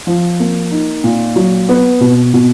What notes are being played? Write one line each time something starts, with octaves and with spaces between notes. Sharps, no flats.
F3
A#3
D#4
A#2
F#3
B3
B2
B2